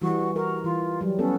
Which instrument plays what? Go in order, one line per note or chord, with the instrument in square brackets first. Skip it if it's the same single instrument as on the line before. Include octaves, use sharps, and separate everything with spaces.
[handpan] E3 G3 [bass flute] F#4
[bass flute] F#4 [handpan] A#4
[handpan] E3 [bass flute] F4
[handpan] F#3 G3
[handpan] B3 A4 [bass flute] C#4